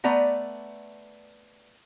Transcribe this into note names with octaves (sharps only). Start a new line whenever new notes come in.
A3 B3 D5 A#5